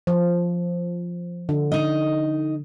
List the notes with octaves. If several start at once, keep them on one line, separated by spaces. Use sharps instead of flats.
F3
D3
D#4 D#5